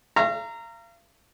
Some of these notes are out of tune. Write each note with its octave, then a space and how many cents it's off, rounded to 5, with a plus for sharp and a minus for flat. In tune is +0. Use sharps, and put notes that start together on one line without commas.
F5 -40 A#5 -15 C#6 -30